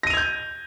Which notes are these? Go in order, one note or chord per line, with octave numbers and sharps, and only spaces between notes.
G6 G#6 A#6 D#7 F7